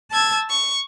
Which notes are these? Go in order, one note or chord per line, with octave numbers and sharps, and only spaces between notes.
A5 E6 G#6 A6
C#6